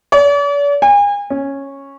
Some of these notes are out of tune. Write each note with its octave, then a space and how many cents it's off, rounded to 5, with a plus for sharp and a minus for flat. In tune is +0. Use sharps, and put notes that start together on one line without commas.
D5 -45
G#5 -35
C#4 -10